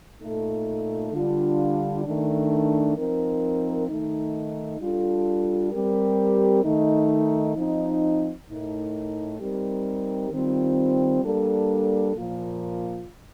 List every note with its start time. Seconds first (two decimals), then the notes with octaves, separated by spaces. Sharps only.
0.20 A#2 A3 D#4 A4
1.12 D3 G3 D4 F4
2.04 D#3 A3 D4
2.96 F3 C4 D#4 A#4
3.88 D#3 A3 D#4
4.80 G3 D4 F4 A4
5.72 G3 C4 G4 A#4
6.64 D#3 A3 D#4
7.56 F3 C4 D#4
8.48 A2 A3 D#4 A#4
9.40 G3 C4 D#4 G4 A#4
10.31 D#3 G3 C4 F4
11.23 G3 A#3 D4 A4
12.15 A#2 F3 A#3 F4